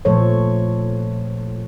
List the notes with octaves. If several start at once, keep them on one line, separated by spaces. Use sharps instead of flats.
A#2 F3 A3 A4 C5 C#5